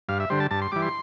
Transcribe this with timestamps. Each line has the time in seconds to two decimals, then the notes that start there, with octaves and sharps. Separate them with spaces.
0.09 G2 F5
0.20 E5
0.30 D3 G3 C5
0.40 A5
0.51 G2 A5
0.62 C6
0.72 E3 G3 D6
0.82 C6